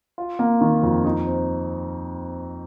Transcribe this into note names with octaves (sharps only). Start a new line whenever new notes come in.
F4
A#3
D#3
F2
D#4
C4